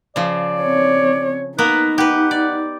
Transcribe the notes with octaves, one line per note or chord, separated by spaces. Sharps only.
C#3 F3 D5
C4 C#5
A#3 B3 D#4 A#4 B4
G4 B4 F#5
D5